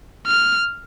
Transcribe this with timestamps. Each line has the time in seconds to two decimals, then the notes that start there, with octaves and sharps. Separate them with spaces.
0.27 F6